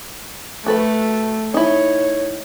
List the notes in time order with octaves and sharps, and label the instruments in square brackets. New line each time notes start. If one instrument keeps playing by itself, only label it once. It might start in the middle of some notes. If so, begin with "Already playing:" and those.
[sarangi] A3 [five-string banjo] F#4 A4 B4
[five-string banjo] D#4 E4 [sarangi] C#5